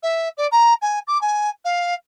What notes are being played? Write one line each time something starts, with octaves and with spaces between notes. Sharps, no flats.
E5
D5
A#5
G#5
D6
G#5
F5